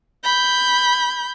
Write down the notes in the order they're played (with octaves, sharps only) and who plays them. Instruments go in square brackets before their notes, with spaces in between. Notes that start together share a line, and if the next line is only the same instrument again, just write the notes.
[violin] B5 G6